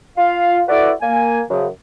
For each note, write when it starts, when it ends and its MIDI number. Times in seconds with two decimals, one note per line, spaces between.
0.17 0.61 65
0.17 0.61 77
0.68 0.92 64
0.68 0.92 66
0.68 0.92 69
0.68 0.92 71
0.68 0.92 74
1.01 1.41 58
1.01 1.41 80
1.49 1.68 42
1.49 1.68 49
1.49 1.68 53